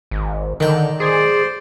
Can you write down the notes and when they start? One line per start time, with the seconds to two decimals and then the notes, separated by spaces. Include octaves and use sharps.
0.11 G#1
0.60 D3 D#3 G5
1.00 G#4 C5 D5